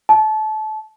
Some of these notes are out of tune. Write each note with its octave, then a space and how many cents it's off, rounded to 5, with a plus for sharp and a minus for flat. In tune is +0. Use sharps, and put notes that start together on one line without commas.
A5 -25